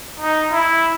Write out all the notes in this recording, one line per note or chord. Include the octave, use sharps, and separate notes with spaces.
D#4
E4